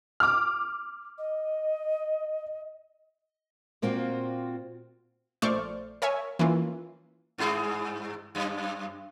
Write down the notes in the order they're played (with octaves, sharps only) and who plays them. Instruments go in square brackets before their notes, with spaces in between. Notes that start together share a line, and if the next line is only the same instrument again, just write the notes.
[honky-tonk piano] D6 F6
[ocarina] D#5
[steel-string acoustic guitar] A#2 A#3 C4 F4 F#4
[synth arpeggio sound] A#1 A3 C5 D5 C#6 F6
A#4 C#5 E5 G#5
E3 A#3 C#4 F4
[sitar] G2 E4 G#4
F#2